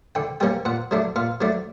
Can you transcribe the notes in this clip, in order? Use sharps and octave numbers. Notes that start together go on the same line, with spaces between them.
D3 G5
G3 A#3 C#4 G5
A#2 F#5
F#3 A3 D4
A#2 F5
F#3 A3 D4